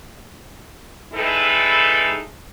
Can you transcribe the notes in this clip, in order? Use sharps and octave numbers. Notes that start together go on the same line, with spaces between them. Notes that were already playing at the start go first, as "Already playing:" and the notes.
G3 G#3 D#4 E4 A4 B4